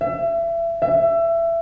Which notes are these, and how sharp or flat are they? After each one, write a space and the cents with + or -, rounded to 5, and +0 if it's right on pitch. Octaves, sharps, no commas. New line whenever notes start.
E5 +30
E5 +25